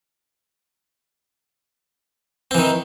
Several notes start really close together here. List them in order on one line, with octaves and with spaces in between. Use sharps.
C4 E3 D#3